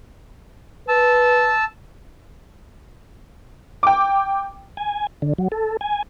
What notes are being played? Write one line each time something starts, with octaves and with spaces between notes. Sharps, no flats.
B4 A5 E6
G5 D6
G#5
D3
F#3
A4
G#5